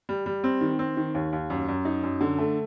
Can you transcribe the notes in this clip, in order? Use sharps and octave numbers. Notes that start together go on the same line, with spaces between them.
G3
G3
C4
D#3
C4
D#3
D#2
D#2
F#2
F#2
D#4
F#2
D3
A3